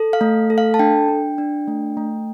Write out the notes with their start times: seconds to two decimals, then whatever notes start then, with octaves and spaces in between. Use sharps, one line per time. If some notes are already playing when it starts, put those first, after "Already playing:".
Already playing: A4
0.13 F5
0.21 A3
0.50 A4
0.58 F5
0.74 A5
0.79 D4 G5
1.09 D4
1.38 D4
1.68 A3
1.97 A3